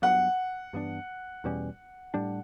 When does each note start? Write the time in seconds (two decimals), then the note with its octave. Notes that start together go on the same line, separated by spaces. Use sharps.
0.02 G2 F#3 B3 F#5
0.73 G2 E3 B3 D4
1.44 E2 B2 G3 C#4
2.14 A2 G3 D4